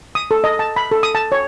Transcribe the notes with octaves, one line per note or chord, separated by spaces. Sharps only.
D#6
A4
D#5
A5
B5
A4
D#6
A5
C#5